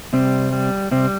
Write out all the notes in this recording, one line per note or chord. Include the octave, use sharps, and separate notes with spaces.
C3 G3 C4
G3
C3 G3 C4